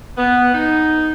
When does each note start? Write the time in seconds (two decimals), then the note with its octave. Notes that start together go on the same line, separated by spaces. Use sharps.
0.17 B3
0.54 D#4